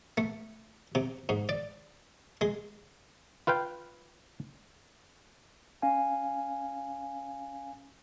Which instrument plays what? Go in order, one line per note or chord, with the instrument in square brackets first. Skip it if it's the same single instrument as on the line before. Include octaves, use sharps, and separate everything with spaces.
[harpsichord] A3
C3
G#2
D5
G#3
[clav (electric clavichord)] F4 B4 F5 G5
[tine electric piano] C#4 F5 G#5